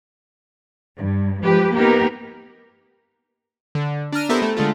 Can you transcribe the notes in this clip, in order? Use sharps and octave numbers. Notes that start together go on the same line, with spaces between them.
G2
F3 G#3 G4 B4
A#3 B3 D#4 G4 A#4 B4
D3
D4 A#5 F6 D#7
B3 E4 G4 A4 A#4 C5
A3
D3 G#3 A3 F4